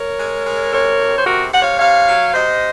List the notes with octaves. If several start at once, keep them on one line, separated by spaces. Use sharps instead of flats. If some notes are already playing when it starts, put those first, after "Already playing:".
Already playing: A#4 C#5
G#3
G#3
C3 A#4 C#5
F2
C5
C3 F#4 A#4
C3 F#5
C#5 F5
C3 C#5 F5
F#3
C3 C5 D#5